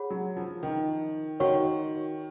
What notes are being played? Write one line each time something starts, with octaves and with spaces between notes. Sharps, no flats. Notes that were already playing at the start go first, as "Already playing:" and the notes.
Already playing: G#4 C#5 F#5 B5
F#3
F3
D#3
D#3 F#4 C#5 F#5 C#6